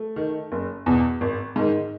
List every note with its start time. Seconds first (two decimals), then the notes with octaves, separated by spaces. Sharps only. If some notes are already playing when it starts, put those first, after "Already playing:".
Already playing: A3
0.16 D#3
0.52 F#1
0.86 E2 B2
1.21 G#1
1.56 G#2 D#3